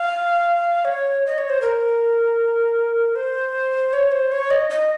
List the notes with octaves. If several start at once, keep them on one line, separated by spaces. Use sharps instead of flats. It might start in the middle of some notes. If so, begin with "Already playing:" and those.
Already playing: F5
C#5
D#5
C#5
C5
A#4
C5
C#5
C5
C#5
D#5
D#5